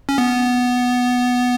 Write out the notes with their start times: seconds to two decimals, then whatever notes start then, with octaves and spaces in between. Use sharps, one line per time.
0.09 C#4
0.18 B3